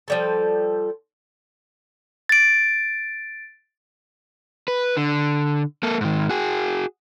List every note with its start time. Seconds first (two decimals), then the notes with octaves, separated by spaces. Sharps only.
0.08 F3 G3 A4
2.29 A6 D7
4.68 B4
4.97 D3
5.83 A#3 A4
6.01 G#2 D#3
6.29 F#4 G#4